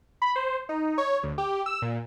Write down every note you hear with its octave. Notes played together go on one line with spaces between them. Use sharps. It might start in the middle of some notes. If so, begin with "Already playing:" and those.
B5
C5
D#4
C#5
D2
G4
E6
A#2